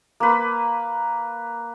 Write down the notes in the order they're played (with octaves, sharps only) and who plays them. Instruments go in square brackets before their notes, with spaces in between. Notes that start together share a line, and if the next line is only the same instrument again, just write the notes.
[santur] A#3 B4